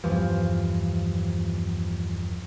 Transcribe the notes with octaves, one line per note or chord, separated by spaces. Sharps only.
E2 G2 E3 F3